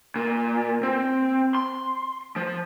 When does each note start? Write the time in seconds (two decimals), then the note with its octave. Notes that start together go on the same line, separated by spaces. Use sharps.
0.16 A#2
0.83 C4
1.55 C6
2.36 F3